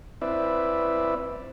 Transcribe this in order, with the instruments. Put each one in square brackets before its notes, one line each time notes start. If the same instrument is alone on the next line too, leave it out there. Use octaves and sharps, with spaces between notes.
[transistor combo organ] C4 E4 B4 D5 E5